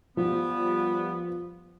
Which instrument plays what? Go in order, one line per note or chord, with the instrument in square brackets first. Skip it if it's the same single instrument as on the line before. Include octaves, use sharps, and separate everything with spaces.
[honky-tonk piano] F3 [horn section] G3 B3